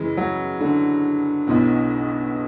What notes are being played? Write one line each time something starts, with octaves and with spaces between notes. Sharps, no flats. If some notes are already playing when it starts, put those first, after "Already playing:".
Already playing: F#2 C#3 E3 G#3
F#3
D3
B1 B2 F#3 B3 E4